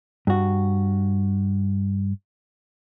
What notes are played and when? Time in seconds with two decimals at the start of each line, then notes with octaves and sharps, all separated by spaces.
0.27 G2 F#4